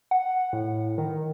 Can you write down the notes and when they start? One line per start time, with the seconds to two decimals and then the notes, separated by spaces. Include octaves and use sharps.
0.11 F#5
0.53 A2
0.98 D#3